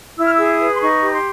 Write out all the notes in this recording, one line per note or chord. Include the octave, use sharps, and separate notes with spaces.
E4 E6
F6
G#4 E6
D#6
B4
C6
D#4 C#6
G4
B5
C6